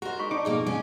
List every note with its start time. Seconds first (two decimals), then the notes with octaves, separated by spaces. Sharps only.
0.02 F#4 G4 A#4 C5 D#5
0.19 G#3 D#4 B5 C#6
0.31 D#4 F#4 D5 A5 D6
0.45 F2 B2 A#3 G#4
0.66 G#2 C3 G#3 C#4 F#5 D6